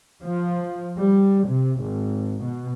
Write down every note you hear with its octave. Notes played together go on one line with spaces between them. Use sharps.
F3
G3
C3
G#1
B2